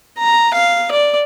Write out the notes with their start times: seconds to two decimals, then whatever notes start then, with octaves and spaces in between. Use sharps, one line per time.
0.18 A#5
0.54 F5
0.91 D5